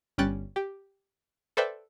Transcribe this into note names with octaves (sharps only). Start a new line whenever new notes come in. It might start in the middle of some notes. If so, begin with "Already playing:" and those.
G1 G3 C#4 G5 F#6 A6
G4
A4 B4 C5 D5 E5 G5